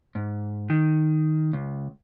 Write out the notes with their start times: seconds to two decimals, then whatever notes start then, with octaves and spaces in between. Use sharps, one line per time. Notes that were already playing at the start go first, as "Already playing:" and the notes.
0.15 G#2
0.70 D#3
1.53 C#2